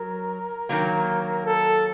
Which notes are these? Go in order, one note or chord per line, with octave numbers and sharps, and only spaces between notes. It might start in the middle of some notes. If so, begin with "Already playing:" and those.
Already playing: F#3 A#4
D#3 F#3 A#3
A4